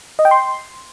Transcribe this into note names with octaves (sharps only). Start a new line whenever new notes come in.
D#5
G5
C6